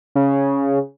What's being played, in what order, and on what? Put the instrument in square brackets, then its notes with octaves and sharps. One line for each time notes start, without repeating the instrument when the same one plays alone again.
[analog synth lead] C#3